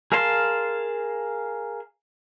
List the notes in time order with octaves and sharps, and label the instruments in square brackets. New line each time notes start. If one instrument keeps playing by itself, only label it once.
[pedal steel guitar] G#4 A#4 F5 A5 C6